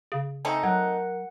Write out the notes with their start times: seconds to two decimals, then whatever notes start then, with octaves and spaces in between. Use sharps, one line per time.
0.12 C#3
0.45 A3 C4 D#4 G#5
0.63 F#3 A#4 F#5